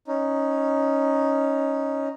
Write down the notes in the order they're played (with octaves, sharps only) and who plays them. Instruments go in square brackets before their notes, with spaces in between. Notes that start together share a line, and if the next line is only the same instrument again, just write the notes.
[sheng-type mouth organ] C#4 D#4